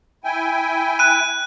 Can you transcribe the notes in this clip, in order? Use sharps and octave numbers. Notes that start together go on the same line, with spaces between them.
E4 G5 G#5
F#6 D#7